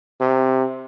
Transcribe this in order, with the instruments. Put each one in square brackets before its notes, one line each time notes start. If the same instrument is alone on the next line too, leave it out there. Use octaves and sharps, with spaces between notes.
[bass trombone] C3